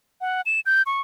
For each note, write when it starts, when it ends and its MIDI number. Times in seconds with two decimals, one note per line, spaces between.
0.21 0.41 78
0.46 0.60 100
0.66 0.82 91
0.86 1.01 85